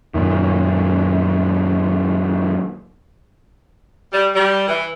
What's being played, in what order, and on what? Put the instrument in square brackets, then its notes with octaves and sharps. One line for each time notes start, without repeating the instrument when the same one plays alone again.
[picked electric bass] F#2 A#2 D#3
[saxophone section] G3
G3
E3